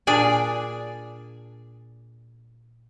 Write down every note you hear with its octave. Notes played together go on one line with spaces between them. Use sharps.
A#2 D4 G#4 D5